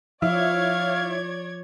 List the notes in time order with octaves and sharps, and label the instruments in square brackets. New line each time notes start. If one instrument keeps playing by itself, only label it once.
[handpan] F3 [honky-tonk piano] E4 [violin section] C#5 D5 G#6 [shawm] F5